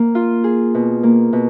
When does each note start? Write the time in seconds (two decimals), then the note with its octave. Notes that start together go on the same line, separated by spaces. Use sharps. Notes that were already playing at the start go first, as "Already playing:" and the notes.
Already playing: A#3
0.15 F4
0.44 G#4
0.74 B2
1.03 A#3
1.33 B2